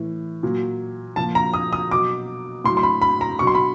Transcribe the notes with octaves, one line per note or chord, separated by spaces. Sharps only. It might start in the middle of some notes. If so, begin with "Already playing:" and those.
Already playing: A2 E3
A#2 F#3
A#2 F3 A5
A#5
D#6
D#6
B2 F#3 D6
A2 F#3 C6
C6
B5
B5
A#5
B2 F#3 C#6
C6
B5